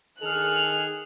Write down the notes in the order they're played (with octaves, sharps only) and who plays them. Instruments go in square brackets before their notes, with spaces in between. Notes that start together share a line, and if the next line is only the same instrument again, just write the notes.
[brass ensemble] D#3 G#4 A4 [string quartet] F6 F#6